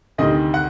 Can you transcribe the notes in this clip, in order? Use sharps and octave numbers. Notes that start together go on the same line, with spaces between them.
D2 C3 D#3 D#5
F#5